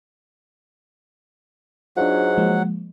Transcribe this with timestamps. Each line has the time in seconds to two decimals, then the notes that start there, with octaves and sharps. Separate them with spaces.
1.97 G#2 F#3 D4 F4 F#5
2.38 F3 G#3 A#3